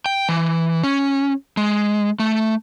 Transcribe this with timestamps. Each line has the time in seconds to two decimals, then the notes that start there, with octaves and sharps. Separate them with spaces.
0.06 G5
0.29 E3
0.84 C#4
1.57 G#3
2.20 A3